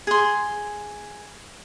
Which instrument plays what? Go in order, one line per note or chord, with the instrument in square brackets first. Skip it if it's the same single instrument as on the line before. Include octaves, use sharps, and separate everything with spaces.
[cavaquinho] G#4 C6